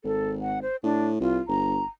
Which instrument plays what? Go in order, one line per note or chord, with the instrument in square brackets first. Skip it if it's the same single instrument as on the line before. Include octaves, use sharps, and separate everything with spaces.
[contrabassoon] G#1 [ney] A4
[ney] F#5
C5
[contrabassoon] A2 [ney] D4
[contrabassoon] C2 [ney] F4
[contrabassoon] G1 [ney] A#5